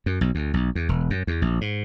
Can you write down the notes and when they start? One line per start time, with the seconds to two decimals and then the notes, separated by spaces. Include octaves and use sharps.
0.06 F#2
0.21 B1
0.35 D2
0.54 B1
0.75 E2
0.89 E1
1.10 F#2
1.27 E2
1.42 A#1
1.61 G#2